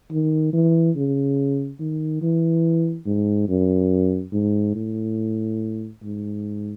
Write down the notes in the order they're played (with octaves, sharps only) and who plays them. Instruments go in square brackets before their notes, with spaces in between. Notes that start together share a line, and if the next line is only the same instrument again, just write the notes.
[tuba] D#3
E3
C#3
D#3
E3
G#2
F#2
G#2
A2
G#2